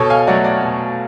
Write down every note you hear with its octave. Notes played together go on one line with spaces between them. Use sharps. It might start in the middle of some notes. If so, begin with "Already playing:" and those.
Already playing: B2 A4 C#5
F5 G#5
F#3 A3 D5 F#5
D5 F#5
B2